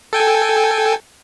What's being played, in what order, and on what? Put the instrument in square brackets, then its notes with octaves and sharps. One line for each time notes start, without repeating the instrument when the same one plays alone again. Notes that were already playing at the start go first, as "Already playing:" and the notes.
[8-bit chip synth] A4 G5 G#5